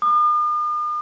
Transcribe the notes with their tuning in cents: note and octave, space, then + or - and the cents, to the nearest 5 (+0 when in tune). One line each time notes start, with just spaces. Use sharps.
D#6 -45